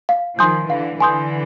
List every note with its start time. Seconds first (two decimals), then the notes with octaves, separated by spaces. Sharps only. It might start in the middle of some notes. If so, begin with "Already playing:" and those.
0.09 F5
0.39 D#3 F3 G#5 C6 D#6 G6
0.69 D3 E3 F5
1.00 D3 E3 G#5 C6 D#6 G6